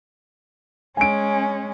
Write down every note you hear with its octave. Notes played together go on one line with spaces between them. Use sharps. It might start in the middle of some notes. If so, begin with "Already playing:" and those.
G#3 C#4 G#5 D7